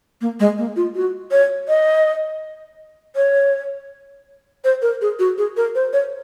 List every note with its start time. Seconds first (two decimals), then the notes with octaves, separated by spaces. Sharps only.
0.21 A#3
0.40 G#3
0.58 A#3
0.76 F4
0.95 F#4
1.31 C#5
1.68 D#5
3.16 C#5
4.64 C5
4.82 A#4
5.01 G#4
5.19 F#4
5.38 G#4
5.57 A#4
5.75 C5
5.93 C#5